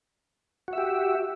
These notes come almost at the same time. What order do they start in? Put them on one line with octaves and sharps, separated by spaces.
F#4 E5 G4